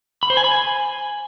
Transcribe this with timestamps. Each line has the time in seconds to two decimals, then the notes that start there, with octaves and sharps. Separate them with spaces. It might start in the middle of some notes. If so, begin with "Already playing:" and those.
0.23 B5
0.30 C5
0.37 G#5
0.44 B5
0.51 G#5